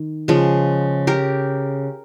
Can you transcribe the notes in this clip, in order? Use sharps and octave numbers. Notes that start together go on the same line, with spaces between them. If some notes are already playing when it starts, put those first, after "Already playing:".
Already playing: D#3
C#3 F3 G#3
G4 A#4